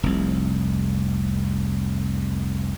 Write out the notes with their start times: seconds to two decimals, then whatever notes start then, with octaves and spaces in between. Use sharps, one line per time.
0.03 F1 C2